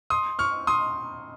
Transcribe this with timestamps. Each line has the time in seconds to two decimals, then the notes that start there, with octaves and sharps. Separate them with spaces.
0.10 C6 D#6
0.39 C#6 F6
0.67 C6 D#6